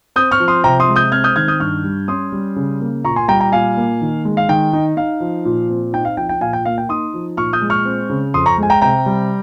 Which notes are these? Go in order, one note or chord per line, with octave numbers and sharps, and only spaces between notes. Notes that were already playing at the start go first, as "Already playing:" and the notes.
C4 D#6 G6
C#6 F6
F3
C6 D#6
C3 G5 A#5
C6 D#6
G#3
D#6 G6
C4 F6 G#6
D#6 G6
D#3 F6 G#6
D#6 G6
G2 C#6 F6
G3
C#4 C6 D#6
G3
C#3
A#3
A#2 A#5 C#6
G#5 C6
G3 G5 A#5
G5 A#5
A#2 F5 G#5
A#3
D#3
G#3
F5
D#3 G5
D#4
D#4 F5
F3
A#2
C4
D#4 G5
F5
F3 G5
G5
A#2 F5 G#5
G5
A#3 F5
G5
D#4 C6 D#6
F3
A#2 C#6 F6
D#6 G6
G#3
C#6 F6
C4
C#3
F2 C6 D#6
A#5 C#6
G#3 G#5
G5 A#5
C3 G5 A#5
G3